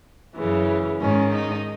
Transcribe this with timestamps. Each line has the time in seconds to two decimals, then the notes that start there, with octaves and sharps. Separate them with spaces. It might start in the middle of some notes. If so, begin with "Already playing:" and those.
0.36 F#2 C#3 E3
1.01 G#2 D#3 C#4
1.33 D#4